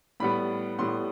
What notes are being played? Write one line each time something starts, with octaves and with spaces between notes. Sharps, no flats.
A2 G3 B3 B5
A2 G3 B3 C6